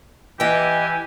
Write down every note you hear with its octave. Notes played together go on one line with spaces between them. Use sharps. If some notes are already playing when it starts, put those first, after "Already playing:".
E3 G4 D#5 G5 G#5